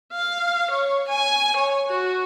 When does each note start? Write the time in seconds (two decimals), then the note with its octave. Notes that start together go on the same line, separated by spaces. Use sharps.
0.12 F5
0.71 C#5
1.08 G#5
1.56 C#5
1.87 F#4